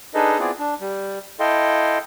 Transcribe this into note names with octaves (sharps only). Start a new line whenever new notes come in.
D4 D#4 G#4 A4 B4 D#5
B3 C4 E4 F4 G#4 D5
D4
G3
E4 A4 D#5 F5 G5 C6